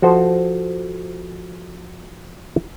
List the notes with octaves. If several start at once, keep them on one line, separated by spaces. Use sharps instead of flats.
F3 F#4 A4 C5